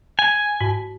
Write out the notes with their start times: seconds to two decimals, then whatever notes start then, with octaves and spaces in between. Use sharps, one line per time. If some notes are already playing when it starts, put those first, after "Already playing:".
0.19 G#5
0.61 G#2